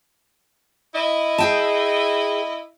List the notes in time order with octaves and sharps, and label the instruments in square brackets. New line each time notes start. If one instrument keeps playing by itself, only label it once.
[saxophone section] E4 D#5
[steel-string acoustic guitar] G#4 G5 A5